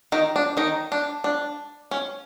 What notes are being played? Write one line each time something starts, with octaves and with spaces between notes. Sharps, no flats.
D#3 D#4
D4
D#3 D#4
D4
D4
C#4